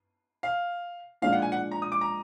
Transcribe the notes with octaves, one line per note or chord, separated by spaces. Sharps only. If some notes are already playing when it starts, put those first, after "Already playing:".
F5
A#2 F3 G#3 D4 F5
F#5
G#5
F#5
A#5
D#6
D6
A#5